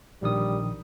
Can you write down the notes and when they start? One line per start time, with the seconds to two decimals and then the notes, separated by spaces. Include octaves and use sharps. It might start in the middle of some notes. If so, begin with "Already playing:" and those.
0.22 A#1 D#3 G3 D#6